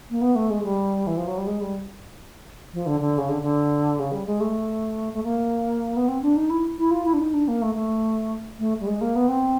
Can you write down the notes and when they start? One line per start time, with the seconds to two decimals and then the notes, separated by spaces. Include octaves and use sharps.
0.10 A#3
0.21 B3
0.35 A3
0.50 G#3
0.64 G3
1.07 E3
1.17 F3
1.28 F#3
1.38 G3
1.47 G#3
1.61 G3
2.74 F3
2.86 D3
3.00 D3
3.18 C#3
3.29 D3
3.42 D3
3.99 C#3
4.12 G3
4.26 G#3
4.40 A3
5.13 A3
5.24 A#3
5.96 B3
6.08 C4
6.22 D4
6.37 D#4
6.50 E4
6.78 E4
6.91 F4
7.05 E4
7.14 D4
7.19 D#4
7.34 D4
7.48 A#3
7.62 A3
7.75 A3
8.59 A3
8.80 G3
8.87 G#3
9.01 A#3
9.15 B3
9.29 C4